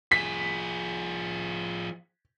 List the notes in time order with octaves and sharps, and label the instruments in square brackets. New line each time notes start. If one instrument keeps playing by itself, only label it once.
[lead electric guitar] F3 G#4 [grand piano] B6